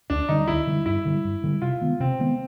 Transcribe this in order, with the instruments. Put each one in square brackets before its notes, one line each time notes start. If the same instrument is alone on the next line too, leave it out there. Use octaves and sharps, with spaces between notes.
[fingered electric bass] D2 [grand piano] D4
[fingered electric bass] D3 G3 [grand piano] D#4
[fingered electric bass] D2 [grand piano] E4
[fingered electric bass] D3 G3
[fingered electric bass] G2 [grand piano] E4
[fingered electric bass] D3 G3
G2
D3 G3
[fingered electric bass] C3 [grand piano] F4
[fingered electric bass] D#3 G#3 B3
[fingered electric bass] C3 [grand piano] C4
[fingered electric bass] D#3 G#3 B3